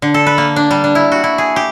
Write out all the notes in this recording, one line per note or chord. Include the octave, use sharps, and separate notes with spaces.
D3
A4
B4
A#3
D4
G3
D4
E4
F#4
E4
G#4
G4